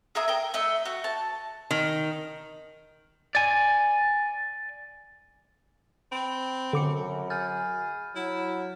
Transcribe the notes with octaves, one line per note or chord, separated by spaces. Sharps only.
G#4 A#4 E5 D#6
A#4 G5
A3 D#5 E6
F#4
A5
D#3
D5 G#5
C4 B5
F#2 D3 D6 C#7
G#4 F6 G6 A6
F#3 E4